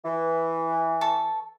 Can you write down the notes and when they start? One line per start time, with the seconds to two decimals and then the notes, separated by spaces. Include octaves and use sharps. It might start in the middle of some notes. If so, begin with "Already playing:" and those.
0.05 E3
1.01 A4 A5 C#6